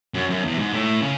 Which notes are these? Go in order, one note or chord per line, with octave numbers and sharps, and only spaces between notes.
F#2
F#2
E2
G#2
A2
C#3